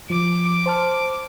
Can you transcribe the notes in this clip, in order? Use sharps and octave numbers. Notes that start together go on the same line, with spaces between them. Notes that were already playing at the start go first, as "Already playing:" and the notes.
F3 D6
C5 A5 F6